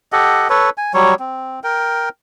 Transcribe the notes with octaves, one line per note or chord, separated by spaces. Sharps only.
G4 A4 D#5 F#5
A4 B4 C#5
G#5
F#3 G3 C#5
C4
A#4 G5